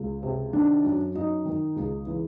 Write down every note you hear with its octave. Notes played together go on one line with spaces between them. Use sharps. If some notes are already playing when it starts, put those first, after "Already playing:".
Already playing: C#2
C3
D#3 D4
F#2
F#2 D#4
D#3
C#2
E3